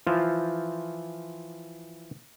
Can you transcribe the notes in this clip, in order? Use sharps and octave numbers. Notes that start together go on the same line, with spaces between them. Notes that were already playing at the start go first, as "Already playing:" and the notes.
E3 F3 F4 C5